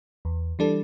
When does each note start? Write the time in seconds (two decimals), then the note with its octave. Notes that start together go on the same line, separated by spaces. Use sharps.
0.25 E2
0.59 E3 G3 D4 A4